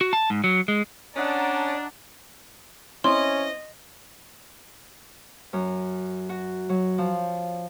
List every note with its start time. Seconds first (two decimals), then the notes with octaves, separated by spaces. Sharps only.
0.01 F#4
0.13 A5
0.30 G#2
0.44 F#3
0.68 G#3
1.16 C#4 D4 D5 D#5 F#5 A5 A#5
3.04 C4 C#4 E4 D#5 C6
5.53 F#2
6.29 F#4
6.69 F#3
6.98 F3